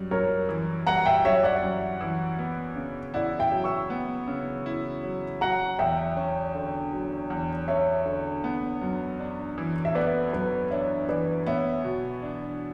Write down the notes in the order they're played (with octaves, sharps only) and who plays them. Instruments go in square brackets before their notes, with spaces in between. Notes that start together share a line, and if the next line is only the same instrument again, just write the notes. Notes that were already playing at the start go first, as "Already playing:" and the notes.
Already playing: [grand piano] F#2 G3
[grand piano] F#2 [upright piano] A#4 C#5
[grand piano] E3
[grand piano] G3 [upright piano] F#5 A#5
[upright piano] E5 G5
[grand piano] F#2 [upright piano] C#5 E5
[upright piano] D5 F#5
[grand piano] F#2
E3
B3
C#3
[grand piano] E4 [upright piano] D5 F#5
[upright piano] E5 G5
[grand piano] F#3
[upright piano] C#6 E6
[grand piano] B3
C#3
E4
F#3
[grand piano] F#3 [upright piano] F#5 A#5
[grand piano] E2 [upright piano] E5 G5
[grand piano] C#4
D3
F#3
E2
[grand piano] C#4 [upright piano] C#5 E5
[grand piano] D3
B3
F#2
D4
E3
[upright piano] E5
[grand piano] B3 [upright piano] B4 D5
[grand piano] F#2 [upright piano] B4
[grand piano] D4 [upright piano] C#5 E5
[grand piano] E3 [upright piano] B4 D5
[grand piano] B3 [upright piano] C#5 E5
[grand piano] B2
D4